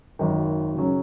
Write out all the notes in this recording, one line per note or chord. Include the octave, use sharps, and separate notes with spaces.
G#1 F#2 D#3
C#3 F#3 C#4